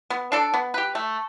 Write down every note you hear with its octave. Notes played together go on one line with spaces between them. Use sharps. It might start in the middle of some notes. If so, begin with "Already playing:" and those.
B3
D4 A4 D5
B3
G4 B4
A3